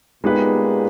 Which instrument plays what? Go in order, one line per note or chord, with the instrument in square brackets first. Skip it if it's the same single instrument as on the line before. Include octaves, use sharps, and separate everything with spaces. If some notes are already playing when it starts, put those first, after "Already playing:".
[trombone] A#2 [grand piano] G#3 B3 D#4 G4 B4